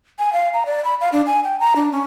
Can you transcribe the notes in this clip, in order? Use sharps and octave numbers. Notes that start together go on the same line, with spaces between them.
G#5
F5
A#5
D5
B5
F5
D4
G#5
G5
A#5
D4
C#4